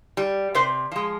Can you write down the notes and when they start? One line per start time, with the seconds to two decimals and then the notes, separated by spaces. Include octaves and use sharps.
0.17 G3
0.55 C3 C5
0.92 F3 G#3